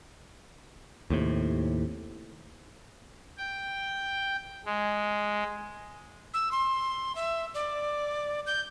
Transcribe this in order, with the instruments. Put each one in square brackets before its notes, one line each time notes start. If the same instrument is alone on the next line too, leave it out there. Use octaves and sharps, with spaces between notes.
[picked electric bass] D#2 A2 C3
[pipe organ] G5
G#3
[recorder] E6
C6
E5
D5
G6